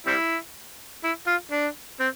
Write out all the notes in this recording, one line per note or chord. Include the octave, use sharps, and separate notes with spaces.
G3 C4 E4
E4
F4
D4
C4